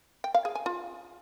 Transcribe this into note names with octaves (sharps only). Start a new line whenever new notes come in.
G5
F5
G#4
G#5
F4